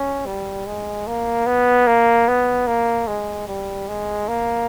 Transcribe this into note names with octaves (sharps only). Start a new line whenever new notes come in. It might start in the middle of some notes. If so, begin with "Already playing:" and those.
Already playing: C#4
G3
G#3
A#3
B3
A#3
B3
A#3
G#3
G3
G#3
A#3